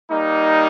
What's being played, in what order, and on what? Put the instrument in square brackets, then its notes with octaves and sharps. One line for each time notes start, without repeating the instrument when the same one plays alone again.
[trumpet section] G3 A#3 D#4